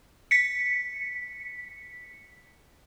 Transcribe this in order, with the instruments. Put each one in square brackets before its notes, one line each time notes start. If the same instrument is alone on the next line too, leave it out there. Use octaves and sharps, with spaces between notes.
[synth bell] B6 C#7